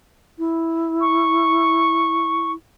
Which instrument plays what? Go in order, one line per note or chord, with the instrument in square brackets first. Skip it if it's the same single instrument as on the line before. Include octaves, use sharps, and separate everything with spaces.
[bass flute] E4
[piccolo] C#6